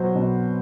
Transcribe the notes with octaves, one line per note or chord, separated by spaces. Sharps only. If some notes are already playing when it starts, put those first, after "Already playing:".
Already playing: B2 F#3 C5
B2